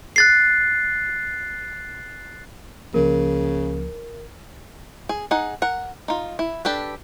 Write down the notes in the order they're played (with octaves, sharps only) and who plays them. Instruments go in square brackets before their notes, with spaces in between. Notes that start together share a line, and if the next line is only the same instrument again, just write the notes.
[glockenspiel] F#6 A6 C7
[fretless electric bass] C#2 F3 A#3 [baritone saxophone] C#3 [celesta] A#4
[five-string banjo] G#4
D#4 G#4 F#5
A#4 F#5
D#4 F4
E4
D4 G4 A4 B4